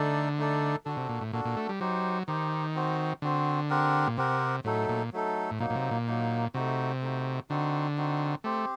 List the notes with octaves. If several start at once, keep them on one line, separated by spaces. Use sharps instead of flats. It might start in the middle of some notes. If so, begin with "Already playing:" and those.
Already playing: D3 A3 D#4 A4 D5
A3 D#4 A4 D5
D3 D4 F#4 A4
C3
A#2
A2
A#2 D4 F#4 A4
A#2
A3
G3
F#3 D#4 G4 C5
D#3 D#4 G4 C5
C4 F#4 C5
D3 C4 F#4 C5
C4 G4 A#4 F#5
A#2
C3 C4 G4 A#4 F#5
A2 F#3 A3 D#4 A4
A#2
F#3 A3 D#4 A4
A2
A#2 F#3 A#3 D#4
A#2
C3
A#2
F#3 A#3 D#4
C3 A3 D#4 F#4
A3 D#4 F#4
D3 C4 D#4 F#4
C4 D#4 F#4
A3 C4 G4 C5